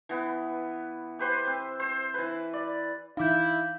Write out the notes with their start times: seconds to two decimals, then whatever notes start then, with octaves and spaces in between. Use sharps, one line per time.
0.09 E3 B3
1.19 G4 B4 C5
1.47 C4
1.80 C5
2.14 E3 B4
2.53 D5
3.17 E3 D#4 E4 F5 D6 G6